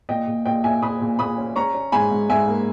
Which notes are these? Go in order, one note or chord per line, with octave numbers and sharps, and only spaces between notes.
A#2 D#5 G5
A#2
A#2 D#5 G5
A#2 E5 G#5
A#2 B5 D#6
A#2
A#2 B5 D#6
C#4
C#4 A#5 C#6
C#4
G#2 G#5 B5
G#2
G#2 E5 G#5
A#3